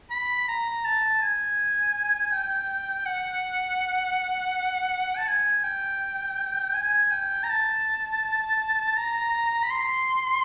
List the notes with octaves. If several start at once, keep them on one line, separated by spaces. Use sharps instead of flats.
B5
A#5
A5
G#5
G5
F#5
A5
G#5
G5
G#5
G5
A#5
A5
A#5
B5
C6